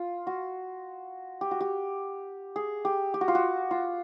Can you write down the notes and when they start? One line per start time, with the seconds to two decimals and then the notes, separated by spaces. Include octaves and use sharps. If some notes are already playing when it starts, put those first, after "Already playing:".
Already playing: F4
0.27 F#4
1.41 G4
1.51 F#4
1.61 G4
2.56 G#4
2.85 G4
3.14 G4
3.21 F#4
3.28 F4
3.35 F#4
3.71 F4